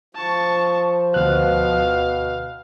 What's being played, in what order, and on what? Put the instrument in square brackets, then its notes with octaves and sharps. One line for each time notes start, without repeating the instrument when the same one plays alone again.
[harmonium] F3 [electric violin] A5 C#6
[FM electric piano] D2 F#6 [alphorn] B2 [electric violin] F5